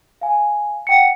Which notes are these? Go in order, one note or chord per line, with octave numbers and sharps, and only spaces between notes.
F5 G#5
F#5 G5 C#7